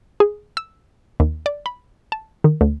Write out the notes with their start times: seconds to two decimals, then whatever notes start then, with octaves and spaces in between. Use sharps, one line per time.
0.20 G#4
0.57 E6
1.20 D#2
1.46 D5
1.66 B5
2.12 A5
2.44 D#3
2.61 D2